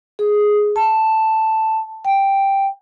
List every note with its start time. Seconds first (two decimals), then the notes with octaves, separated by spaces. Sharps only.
0.19 G#4
0.76 A5
2.05 G5